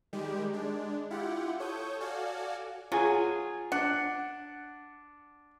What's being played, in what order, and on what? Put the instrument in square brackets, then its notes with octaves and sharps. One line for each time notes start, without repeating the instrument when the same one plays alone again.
[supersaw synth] D#3 G3 G#3 G4
G#3 D4
E4 F4 G4 F#5
A4 C#5 C#6 D#6 G6
F#4 A4 D5 F5 G#5
[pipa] F#3 [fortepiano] F4 G#4 G#5
[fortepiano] D4 [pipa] F#5